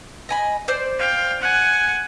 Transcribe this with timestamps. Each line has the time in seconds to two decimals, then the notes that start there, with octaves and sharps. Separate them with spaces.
0.29 D#5 G#5 B5
0.68 C5 D5
0.99 F5 G5
1.42 F#5 G#5